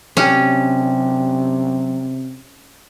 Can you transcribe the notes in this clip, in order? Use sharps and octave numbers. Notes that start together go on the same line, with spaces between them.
F#2 C3 C#4 D4 G4